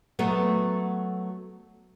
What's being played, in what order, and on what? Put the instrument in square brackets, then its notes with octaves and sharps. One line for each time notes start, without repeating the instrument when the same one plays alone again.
[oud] F#3 A3 B3